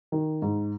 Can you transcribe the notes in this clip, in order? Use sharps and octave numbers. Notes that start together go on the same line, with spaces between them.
D#3
G#2